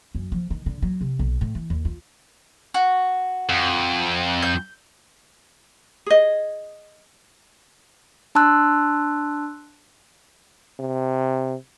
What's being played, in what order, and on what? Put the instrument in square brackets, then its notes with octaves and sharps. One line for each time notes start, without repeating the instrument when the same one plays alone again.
[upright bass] F#2
F3
D#3
D3
F#3
C3
B1
A2
E3
D#2
F4
[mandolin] F#4
[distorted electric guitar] F2
[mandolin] G6
[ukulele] G#4 D#5
[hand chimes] D4 A5 C6 E6 F#6
[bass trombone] C3